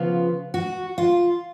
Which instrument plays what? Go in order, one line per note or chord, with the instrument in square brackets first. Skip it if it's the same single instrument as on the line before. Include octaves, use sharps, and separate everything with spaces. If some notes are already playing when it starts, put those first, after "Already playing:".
Already playing: [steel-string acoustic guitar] C#3 F3 B3 F4
F#4
F4